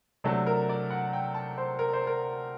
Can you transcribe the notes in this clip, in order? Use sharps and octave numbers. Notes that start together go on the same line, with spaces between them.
C3 F#3 A3 D4 A4
A#4
D5
F#5
G5
A5
C5
A#4
C5
A#4